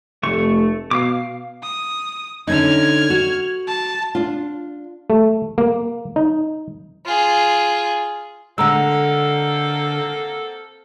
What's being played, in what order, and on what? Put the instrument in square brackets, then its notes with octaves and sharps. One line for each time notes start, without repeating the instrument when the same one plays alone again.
[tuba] F1 [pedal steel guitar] A3 C#6
[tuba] B2 [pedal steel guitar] F5 D6
[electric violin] D#6
[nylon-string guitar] D3 C#4 D#4 [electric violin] F6 G#6
[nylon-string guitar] F#4
[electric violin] A5
[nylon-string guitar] D4 F4
[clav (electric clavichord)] A3
A#3
D#4
[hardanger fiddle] F4 G#4
[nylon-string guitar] D3 G#3 [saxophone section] A#3 C4 A4 [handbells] F#5 A#5 E6